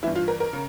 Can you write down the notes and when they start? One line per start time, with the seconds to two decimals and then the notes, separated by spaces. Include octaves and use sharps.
0.03 G2 E3 E4
0.15 F4
0.28 A#4
0.40 A#4
0.53 C#3